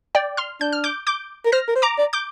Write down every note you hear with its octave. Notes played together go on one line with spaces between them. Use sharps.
D5 G5
C6 F6
D4 G6
F6
D6 G6
D6 G6
A#4
C5 F6 A#6
A#4
C5
A#5 D6
D5
D6 G6